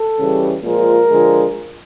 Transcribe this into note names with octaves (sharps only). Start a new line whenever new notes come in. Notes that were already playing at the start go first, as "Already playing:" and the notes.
Already playing: A4
C#3 E3 G3
A#2 F3 G#3 A#4
D3 F3 G#3